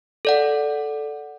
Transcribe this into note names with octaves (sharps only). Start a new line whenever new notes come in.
A4 D5 F#5